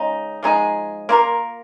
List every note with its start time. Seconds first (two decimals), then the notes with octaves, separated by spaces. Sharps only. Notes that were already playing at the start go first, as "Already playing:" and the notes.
Already playing: C#3 G#3 D#4
0.43 F3 G#3 D#4 G#4
1.09 A#3 F4 A#4